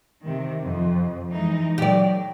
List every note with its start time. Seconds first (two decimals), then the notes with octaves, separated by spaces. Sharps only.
0.22 C3 D#3
0.63 F2
1.32 E3 G#3 D#4
1.78 F#3 G4 D5